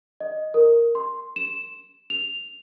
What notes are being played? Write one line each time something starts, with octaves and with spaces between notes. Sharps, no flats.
D#5
A#4
C6
E7
F7